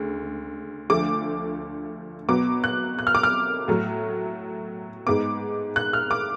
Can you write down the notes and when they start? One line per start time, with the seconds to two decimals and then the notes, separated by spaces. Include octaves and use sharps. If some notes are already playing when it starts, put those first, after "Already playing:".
Already playing: D2 C#3 G#3
0.90 D2 D3 F3 A3 D6
2.29 B2 F#3 B3 D6
2.64 F#6
2.99 F#6
3.07 F6
3.15 D6
3.23 F6
3.68 A2 F#3 A3
5.07 G#2 G#3 B3 D6
5.76 F#6
5.93 F6
6.11 D6